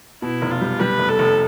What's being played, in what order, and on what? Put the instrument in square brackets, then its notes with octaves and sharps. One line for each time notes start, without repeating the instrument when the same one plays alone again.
[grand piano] B2 [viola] E4
[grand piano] F1
[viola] F4
[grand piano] G3
[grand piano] G3 [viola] B4
[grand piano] F1
[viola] A4
[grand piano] F1